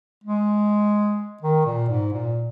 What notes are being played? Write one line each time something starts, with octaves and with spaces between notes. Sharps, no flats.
G#3
D#3
A#2
G#2
A#2